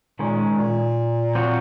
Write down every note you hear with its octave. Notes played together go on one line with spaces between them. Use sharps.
A#2 D#3 G#3 C#4
A#2
F3 C4 F#4 C#5